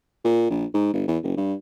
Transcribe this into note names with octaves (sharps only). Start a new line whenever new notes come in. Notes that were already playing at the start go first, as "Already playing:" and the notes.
A#2
A#1
G#2
G1
E2
F#1
G2